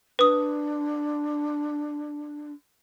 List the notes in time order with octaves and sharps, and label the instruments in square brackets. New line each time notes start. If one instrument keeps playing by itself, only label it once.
[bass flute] D4 [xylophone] B4 D#6